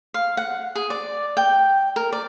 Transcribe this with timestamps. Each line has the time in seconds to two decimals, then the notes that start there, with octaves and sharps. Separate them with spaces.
0.14 F5
0.37 F#5
0.75 G#4
0.90 D5
1.37 G5
1.96 A#4
2.12 D5